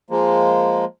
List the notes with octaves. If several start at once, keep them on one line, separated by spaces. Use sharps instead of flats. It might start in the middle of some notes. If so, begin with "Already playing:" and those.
F3 G#3 A#3